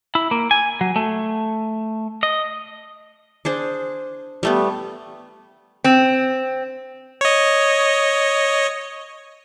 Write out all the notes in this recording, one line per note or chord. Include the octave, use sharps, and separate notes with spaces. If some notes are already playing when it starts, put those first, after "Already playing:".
E4
A#3
G#5
F#3
A3
D#5
D4 G#4 C5
G3 A3 B3
C4
C#5 D#5